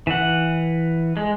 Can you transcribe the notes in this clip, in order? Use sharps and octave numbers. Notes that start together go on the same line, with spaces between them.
E3 F#5
G#3